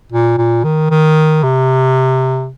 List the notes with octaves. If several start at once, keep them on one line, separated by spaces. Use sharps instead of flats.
A#2
A#2
D#3
D#3
C3